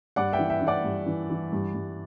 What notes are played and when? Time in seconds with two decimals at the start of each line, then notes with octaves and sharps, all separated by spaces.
0.16 G2 D5 F#5
0.33 E5 G5
0.39 E3
0.50 E5 G5
0.61 E3
0.67 D5 F#5
0.84 G2
1.06 E3
1.30 E3
1.52 G2
1.74 G2